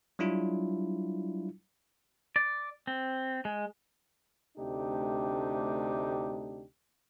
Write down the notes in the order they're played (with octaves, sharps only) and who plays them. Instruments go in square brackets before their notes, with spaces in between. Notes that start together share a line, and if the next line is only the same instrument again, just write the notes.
[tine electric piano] F#3 G3 D4 E4 F4
[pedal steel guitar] D5
C4
G#3
[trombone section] D2 C3 A3 D4 D#4 G4